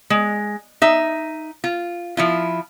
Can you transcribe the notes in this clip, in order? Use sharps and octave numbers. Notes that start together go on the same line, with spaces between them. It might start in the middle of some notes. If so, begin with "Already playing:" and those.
G#3
D#4 E5
F4
F3 E4 F4